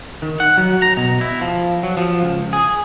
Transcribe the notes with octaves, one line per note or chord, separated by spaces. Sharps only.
D#3
F#5
F#3
A#5
B2
E4
F3
F#3
F3
C#2
G#4